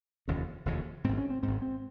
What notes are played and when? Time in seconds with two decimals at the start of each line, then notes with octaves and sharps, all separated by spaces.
0.28 F1 D#2 C#3
0.65 F1 D#2 C#3
1.04 G#2 C4
1.09 G#1
1.18 C#4
1.30 C4
1.43 G#1 G#2 C4
1.62 C4